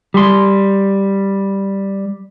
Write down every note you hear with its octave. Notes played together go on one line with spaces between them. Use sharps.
G3 C6